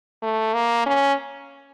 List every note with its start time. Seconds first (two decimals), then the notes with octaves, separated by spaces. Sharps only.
0.23 A3
0.54 A#3
0.86 C#4